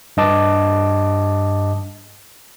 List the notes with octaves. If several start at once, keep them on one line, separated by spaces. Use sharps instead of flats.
G2 D#5 A5 D6